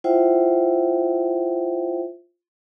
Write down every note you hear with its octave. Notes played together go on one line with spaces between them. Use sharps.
E4 F4 C5 E5 F#5 G5